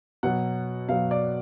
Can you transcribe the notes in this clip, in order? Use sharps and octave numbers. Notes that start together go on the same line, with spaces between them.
B2 F#3 F#5
B2 F#3 F5
D5